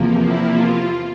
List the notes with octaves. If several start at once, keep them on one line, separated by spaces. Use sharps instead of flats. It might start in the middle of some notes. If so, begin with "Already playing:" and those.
Already playing: E2 C3 F3 A#3
E4
F4